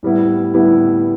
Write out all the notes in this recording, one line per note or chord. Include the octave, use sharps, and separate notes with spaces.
A2 G3 B3 E4
A2 G3 B3 E4